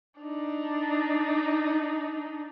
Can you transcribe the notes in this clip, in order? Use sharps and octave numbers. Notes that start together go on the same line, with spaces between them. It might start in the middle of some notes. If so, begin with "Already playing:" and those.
D4 D#4